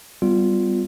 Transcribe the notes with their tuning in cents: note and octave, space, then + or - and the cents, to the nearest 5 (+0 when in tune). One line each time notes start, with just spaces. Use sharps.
G3 +0 B3 +25 F4 +0